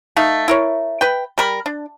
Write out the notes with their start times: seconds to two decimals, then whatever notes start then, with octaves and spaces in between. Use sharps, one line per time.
0.17 A3 D#4 F5
0.48 E4 A#4 C#5
1.01 B4 G5
1.38 G3 A#4 B5
1.66 D4